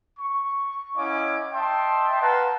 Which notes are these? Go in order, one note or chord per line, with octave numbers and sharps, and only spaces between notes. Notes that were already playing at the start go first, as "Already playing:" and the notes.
C#6
C#4 E4 D#5 F5 F#5 D6
D#5 E5 G5 A5 C6
B4 F5 F#5 A5 A#5 C6